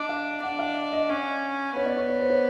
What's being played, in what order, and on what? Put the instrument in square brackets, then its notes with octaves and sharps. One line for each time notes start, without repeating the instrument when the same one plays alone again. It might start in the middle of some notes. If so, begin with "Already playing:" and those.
Already playing: [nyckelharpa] D4 [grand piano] D#5
[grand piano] F5
[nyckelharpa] D4 [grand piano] F#5
[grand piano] F5
D#5
[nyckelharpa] C#4 [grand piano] D5
[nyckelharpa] B3 [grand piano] C#5
[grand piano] D5
C#5
C#5
C5
C#5